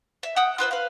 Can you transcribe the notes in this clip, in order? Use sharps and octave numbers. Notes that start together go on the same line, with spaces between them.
E5
F#5 G5 D#6 G6
F4 B4 C5 E5
B4 F5